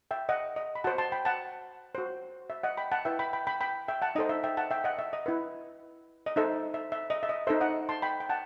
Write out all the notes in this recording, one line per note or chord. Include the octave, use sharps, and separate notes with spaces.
E5 G5
D#5 F#5
D#5
B5
F#4 C5 F#5 A5
A5 C6
G5 B5
F#5 A5
F#4 C5
E5
D#5 F#5
G5 B5
F#5 A5
E4 B4 E5 G5
G5 B5
G5 B5
G5 B5
G5 B5
E5 G5
F#5 A5
D#4 A4 C5 D#5
E5
E5 G5
F#5 A5
E5 G5
D#5 F#5
E5
D#5
E4 B4
D#5
D#4 A4 C5 E5
E5
E5
D#5
E5
D#5
D#4 A4 C5 E5
D#5 F#5
A5 C6
G5 B5
G5
F#5 A5